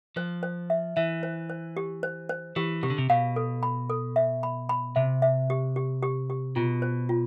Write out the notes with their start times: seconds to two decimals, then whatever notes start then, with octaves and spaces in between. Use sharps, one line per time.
0.16 F3 C5
0.43 C5
0.70 E5
0.96 E3 E5
1.23 C5
1.50 C5
1.77 G4
2.03 C5
2.29 C5
2.56 E3 G4
2.83 C3 G4
2.90 D3
2.98 C3
3.10 B2 F5
3.36 A4
3.63 B5
3.90 A4
4.16 E5
4.43 B5
4.69 B5
4.96 C3 E5
5.22 E5
5.50 G4
5.76 G4
6.03 G4
6.30 G4
6.56 B2 F4
6.82 C5
7.09 F4